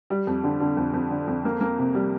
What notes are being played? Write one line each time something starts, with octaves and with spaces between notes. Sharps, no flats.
G3
F2
D3
D3
F2
F2
D3
F2
A#3
A#3
C3
G3